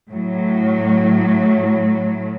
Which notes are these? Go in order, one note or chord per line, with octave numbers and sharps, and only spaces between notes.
A2 F#3